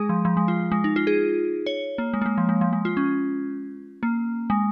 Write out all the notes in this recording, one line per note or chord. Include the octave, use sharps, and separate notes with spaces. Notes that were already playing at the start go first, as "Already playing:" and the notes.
Already playing: G#3 G#4
F3
F3
G#3
F4
G#3
D#4
F4
G#4
C#5
A#3
G#3
A#3
G#3
F3
G#3
F3
G#3
F4
C#4
A#3
G#3